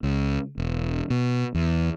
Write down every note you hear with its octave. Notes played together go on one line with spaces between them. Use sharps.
C#2
E1
B2
E2